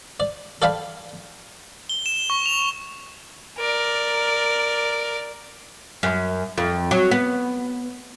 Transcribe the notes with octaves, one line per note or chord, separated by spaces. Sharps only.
D5
A4 D5 F5 G5 A5 B5
G7
E7
C#6
F7
A#4 D5
F#2
F2
F#3
B3